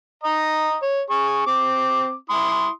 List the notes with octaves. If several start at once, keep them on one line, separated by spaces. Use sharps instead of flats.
D#5 A#5
C#5
G#4 C#6
C4 D6
E4 C6 D#6